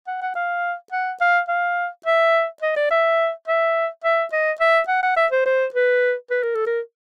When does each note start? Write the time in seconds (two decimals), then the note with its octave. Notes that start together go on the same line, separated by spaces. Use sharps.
0.07 F#5
0.22 F#5
0.35 F5
0.92 F#5
1.21 F5
1.48 F5
2.06 E5
2.62 D#5
2.76 D5
2.91 E5
3.48 E5
4.04 E5
4.32 D#5
4.60 E5
4.88 F#5
5.03 F#5
5.17 E5
5.32 C5
5.46 C5
5.74 B4
6.31 B4
6.43 A#4
6.55 A4
6.66 A#4